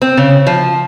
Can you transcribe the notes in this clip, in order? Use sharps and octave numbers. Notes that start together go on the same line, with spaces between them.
C4
C#3
F3